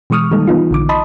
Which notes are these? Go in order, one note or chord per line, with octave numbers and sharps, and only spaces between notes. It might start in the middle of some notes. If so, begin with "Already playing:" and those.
B2 E3 G#3 C#6 D#6 F6
D#3 G3 G#3 A#3 D#4 A4
E3 B3 D#4 F4
A#1 D3 D6
D#5 A5 B5 C6 D#6